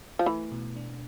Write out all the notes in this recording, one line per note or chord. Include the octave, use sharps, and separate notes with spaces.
F3
E3 A3
B2
D4